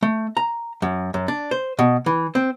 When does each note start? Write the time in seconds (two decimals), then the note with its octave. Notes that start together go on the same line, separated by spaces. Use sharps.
0.03 A3
0.37 A#5
0.82 F#2
1.14 F#2
1.28 D4
1.51 C5
1.79 B2
2.06 E3
2.35 C4